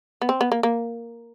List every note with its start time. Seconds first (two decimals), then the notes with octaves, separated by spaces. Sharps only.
0.22 B3
0.29 C4
0.41 B3
0.52 A#3
0.63 A#3